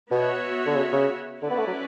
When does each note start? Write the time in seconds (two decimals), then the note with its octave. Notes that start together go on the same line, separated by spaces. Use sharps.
0.11 B2 B3 F#4 C#5 E5
0.66 D3
0.76 C#3
0.92 C#3
1.41 D3 C#4 E4 B4 D5
1.50 B3
1.58 A3
1.67 F#3